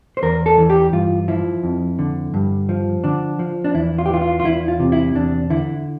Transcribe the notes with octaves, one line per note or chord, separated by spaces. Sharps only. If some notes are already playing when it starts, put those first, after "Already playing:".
C5
E2 A#4
A4
E3
G4
G2 F4
F3 E4
F2
D3
G2
F3
D3 D4
F3
D4
E2 E4
F4
G4
E3 F4
F4
F4
E2 E4
F4
C3
E4
E2 D4
D3 E4